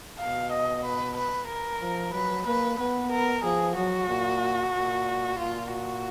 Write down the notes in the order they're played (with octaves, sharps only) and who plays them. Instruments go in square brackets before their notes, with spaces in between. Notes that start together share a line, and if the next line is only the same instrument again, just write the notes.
[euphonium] B2 [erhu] F5
[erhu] D#5
B4
B4
A#4
[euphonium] F3
[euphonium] F#3 [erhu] B4
[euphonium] A#3 [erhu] B4
[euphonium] B3 [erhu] B4
[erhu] A#4
[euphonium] F3 [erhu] G#4
[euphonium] F#3 [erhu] F#4
[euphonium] A#2
A#2
[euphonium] A#2 [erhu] F4
[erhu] F#4